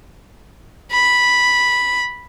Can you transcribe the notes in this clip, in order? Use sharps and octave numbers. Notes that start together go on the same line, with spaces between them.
B5